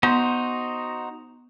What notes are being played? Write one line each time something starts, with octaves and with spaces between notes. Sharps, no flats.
B3 D#4 F#4 C5 C6 G6